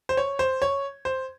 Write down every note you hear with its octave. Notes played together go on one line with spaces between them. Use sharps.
C5
C#5
C5
C#5
C5